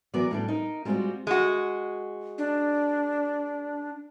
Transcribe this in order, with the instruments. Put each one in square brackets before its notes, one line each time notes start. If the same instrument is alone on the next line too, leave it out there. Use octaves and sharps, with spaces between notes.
[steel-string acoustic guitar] E3 F#3 B3 F#4 A#4 D5
A2 G3 D4
D#4 A#4
G3 G#3 B3 C4 F4 F#4
[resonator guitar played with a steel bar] G#3 F#4
[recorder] D4